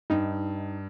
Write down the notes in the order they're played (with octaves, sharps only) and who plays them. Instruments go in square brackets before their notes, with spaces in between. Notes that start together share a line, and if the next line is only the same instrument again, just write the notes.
[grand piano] G2 [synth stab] D#4